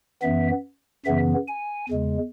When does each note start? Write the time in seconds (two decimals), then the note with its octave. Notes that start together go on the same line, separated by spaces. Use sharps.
0.22 F#2 E3 B3 E5
1.05 F#2 C#3 E3 B3 E5
1.48 G#5
1.89 E2 C#3 G#3